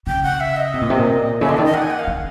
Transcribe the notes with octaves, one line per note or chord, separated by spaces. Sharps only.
C#3 G5
F#5
E5
D#5
C3
A#2
C3
A#2
C#3 E5
D3 D#5
D#3 D5
D#5
F#5
G#5
F#5
F5
D3